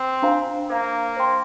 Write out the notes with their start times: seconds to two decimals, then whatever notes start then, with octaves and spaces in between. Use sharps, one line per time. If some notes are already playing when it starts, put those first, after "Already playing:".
Already playing: C4
0.22 D4 F4 C5 F5 A#5
0.69 A#3 C5 F5 A#5
1.17 C5 G5 C6